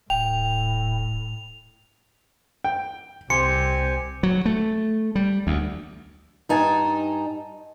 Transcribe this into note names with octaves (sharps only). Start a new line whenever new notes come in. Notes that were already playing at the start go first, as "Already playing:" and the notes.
D1 A2 G5 F7
G5
C2 C4 G4 G#5 C6 C#7
F#3
A3
G3
D2
G2 D#4 G#5 A5